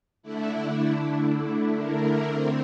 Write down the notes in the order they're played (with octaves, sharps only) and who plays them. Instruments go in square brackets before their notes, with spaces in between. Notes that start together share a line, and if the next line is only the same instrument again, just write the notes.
[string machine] D3 A3 D4 E4
A#4
D3 A3 C4